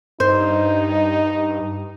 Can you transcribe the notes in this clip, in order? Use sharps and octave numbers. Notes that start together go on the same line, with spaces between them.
G2 D#4 C5